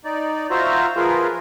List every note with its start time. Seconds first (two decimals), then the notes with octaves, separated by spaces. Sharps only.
0.05 D#4 D5
0.51 F4 F#4 C5 E5 A#5
0.96 F3 F4 G#4 A#4 B4